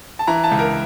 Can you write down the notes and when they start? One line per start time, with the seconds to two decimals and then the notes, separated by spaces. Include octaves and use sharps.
0.19 A5
0.27 E3 A#5
0.44 A5
0.51 C#2
0.59 A#4